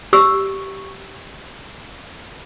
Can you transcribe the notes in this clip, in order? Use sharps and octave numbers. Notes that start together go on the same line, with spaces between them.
G4 E6